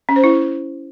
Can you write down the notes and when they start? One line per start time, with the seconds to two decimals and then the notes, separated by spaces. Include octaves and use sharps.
0.09 C#4
0.16 C5
0.24 E4